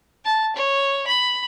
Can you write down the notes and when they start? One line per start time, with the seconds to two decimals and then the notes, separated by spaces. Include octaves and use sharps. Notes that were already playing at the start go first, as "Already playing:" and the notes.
0.25 A5
0.56 C#5
1.07 B5